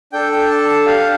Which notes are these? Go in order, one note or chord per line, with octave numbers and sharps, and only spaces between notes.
D4 A4 G5
G5
A5
A5
D4 G4 F5